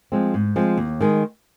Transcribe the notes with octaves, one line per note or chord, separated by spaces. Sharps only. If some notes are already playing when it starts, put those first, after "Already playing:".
F3 G#3 C4
G#2
F3 G#3 C4
D#2
D#3 G#3